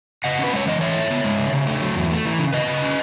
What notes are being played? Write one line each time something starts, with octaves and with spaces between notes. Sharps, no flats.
C#3 D#5 F#5
C#4 B4
G#3 C#5
E3 D#5
A2 C#5 E5
A2
B3
G#3
C#3
C#3
A3
F#3
E2
A3
E3
C#3
C#3 B4 D#5
C#3
C#4